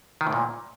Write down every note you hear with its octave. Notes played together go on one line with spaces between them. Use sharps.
D#3
A2
A#2